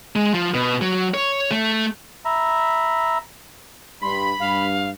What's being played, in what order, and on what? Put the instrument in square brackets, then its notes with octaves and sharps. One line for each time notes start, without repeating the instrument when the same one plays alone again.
[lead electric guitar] G#3
F3
B2
F#3
C#5
A3
[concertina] E5 A#5 B5
[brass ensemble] G2 [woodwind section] B5 [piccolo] C6
[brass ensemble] G2 [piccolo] F5